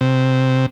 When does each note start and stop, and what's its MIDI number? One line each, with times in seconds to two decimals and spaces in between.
0.01 0.66 48